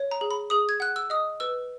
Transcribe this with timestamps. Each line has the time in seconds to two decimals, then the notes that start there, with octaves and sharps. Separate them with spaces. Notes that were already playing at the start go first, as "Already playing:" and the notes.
Already playing: C#5
0.11 A#5
0.21 G#4
0.31 B5
0.50 G#4 D#6
0.69 G#6
0.80 F#5 F#6
0.96 E6
1.10 D#5 D#6
1.40 B4 E6